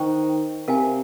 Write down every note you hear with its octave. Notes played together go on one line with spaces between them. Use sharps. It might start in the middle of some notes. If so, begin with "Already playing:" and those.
Already playing: D#3 C5 G5 C#6
C3 A#4 F5 G#5